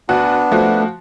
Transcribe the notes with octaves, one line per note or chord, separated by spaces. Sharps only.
D2 B3 D4 F#4
F3 A3 F#4